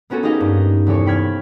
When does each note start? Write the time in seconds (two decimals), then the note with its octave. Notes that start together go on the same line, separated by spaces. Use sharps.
0.10 A#3 B3 C#4 F#4 A4
0.23 D#4 G4 G#4 D#5 F5
0.40 G2
0.86 E2 C3 A4 C#5 C#6
1.06 G5 B5 F6 G#6